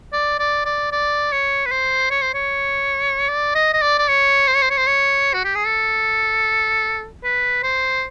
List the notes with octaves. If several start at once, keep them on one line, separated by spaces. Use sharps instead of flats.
D5
D5
D5
D5
C#5
B4
C5
C#5
C5
C#5
D5
D#5
D#5
D5
D5
C#5
C5
C#5
C5
C#5
C5
C#5
F#4
G4
G#4
A4
B4
C5